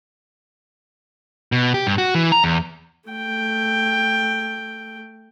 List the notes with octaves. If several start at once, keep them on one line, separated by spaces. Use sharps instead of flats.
B2
G4
G2
F#4
E3
A#5
E2
A3 G5